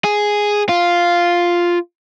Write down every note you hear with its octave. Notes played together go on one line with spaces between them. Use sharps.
G#4
F4